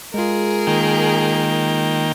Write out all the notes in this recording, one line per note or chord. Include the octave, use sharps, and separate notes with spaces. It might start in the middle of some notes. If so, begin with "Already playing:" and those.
G#3 F4 G#4 A#4
D#3 A#3 G5